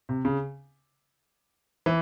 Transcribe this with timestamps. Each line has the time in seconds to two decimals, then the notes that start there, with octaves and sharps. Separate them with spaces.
0.09 C3
0.25 C#3
1.86 E3